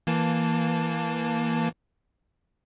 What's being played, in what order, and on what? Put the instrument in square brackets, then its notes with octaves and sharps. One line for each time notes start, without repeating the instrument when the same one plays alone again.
[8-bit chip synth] E3 A#3 A5